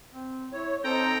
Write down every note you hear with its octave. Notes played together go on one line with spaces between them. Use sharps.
C4
E4 C#5
C4 D#4 A4 C5 G5 A#5